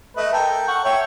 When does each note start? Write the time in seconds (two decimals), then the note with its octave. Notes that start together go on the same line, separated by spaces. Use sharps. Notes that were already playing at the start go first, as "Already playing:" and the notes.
0.17 A3 B4 D#5
0.33 A4 A#4 G5
0.68 F#5 C#6
0.85 C#5 E5 G5